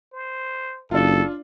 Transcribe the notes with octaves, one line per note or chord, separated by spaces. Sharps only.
C5
F#1 D4 F4 A4